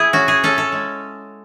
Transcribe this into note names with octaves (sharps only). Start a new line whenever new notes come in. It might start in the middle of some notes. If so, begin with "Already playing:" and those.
Already playing: E4 G#4
C#4 F#4
G#4
C#4 A4
A4
G#3